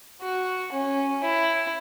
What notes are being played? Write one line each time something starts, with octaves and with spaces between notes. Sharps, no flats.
F#4
C#4
E4